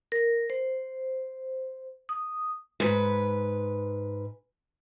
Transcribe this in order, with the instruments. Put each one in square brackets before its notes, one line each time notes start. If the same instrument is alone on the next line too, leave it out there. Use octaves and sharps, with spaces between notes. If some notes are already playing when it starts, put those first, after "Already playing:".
[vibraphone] A#4
C5
D#6
[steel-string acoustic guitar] G#2 B4